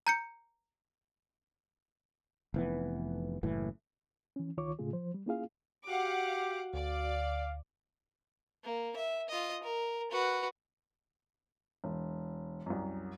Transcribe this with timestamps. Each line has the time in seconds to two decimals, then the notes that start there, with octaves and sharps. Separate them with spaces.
0.07 A#5 G6 C#7
2.54 F1 E3 B3
3.43 F#1 A2 E3
4.36 E3 C#4
4.57 C#2 D#3 F4 C#5 C#6 D6
4.79 A2 C#3 A3 F4 G#4
4.93 F3 C5
5.14 G3
5.26 A#3 C#4 E4 F4 G#4 F5
5.87 F#4 G4 F5 F#5 D6
6.73 D2 D5 F5
8.64 A#3
8.96 E5
9.29 F4 D#5
9.63 A#4
10.12 F#4 B4
11.84 E1
12.66 C2 F#2